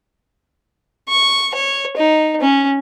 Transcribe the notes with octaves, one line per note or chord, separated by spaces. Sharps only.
C#6
C#5
D#4
C#4